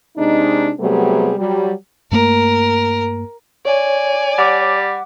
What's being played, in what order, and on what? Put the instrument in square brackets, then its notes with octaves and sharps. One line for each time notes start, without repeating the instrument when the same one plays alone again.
[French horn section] C3 G#3 D4 D#4
C3 F#3 G3 A3 B3 G#4
F#3 G3
[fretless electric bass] G2 A3 A#3 [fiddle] A#4
[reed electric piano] C#5 [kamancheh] D5 G#5
[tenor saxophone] G3 [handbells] F#5 D6